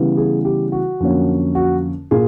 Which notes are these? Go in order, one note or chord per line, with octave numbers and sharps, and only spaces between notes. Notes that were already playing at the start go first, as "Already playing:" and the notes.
Already playing: C#3 E3 G3 B3
G#4
G4
F#4
F2 D3 F#3 A#3 C#4
F#4
A#2 G#4